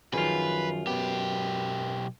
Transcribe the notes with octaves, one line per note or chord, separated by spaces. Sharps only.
F#2 D#3 F3 F4 G#4 B4
B1 B3 G4